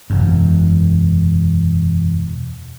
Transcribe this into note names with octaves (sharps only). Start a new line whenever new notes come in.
E1 F#2